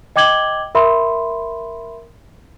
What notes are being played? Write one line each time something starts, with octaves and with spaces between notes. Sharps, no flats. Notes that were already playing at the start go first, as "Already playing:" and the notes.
D#5 G5 D6 G#6 F#7 G7
A#4 E5 B5 C6